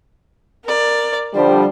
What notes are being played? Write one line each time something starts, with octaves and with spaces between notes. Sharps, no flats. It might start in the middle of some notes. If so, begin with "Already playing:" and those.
A#4 D5
D3 F3 G3 C5